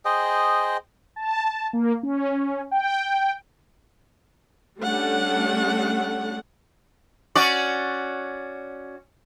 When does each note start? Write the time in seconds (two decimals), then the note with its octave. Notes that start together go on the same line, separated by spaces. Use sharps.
0.05 G#4 C5 D#5 G5
1.16 A5
1.73 A#3
2.03 C#4
2.71 G5
4.81 G3 A3 C#4 D4 F#5
7.35 C#4 F#4 D5